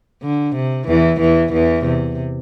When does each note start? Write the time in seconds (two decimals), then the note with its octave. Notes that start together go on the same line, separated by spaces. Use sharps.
0.23 D3
0.55 C3
0.88 E2 E3
1.20 E2 E3
1.53 E2 E3
1.85 C3